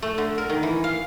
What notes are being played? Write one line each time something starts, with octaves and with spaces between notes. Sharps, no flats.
A3
D3
A#4
D#3
E3
F5